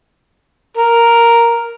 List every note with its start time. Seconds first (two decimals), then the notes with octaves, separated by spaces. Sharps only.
0.77 A#4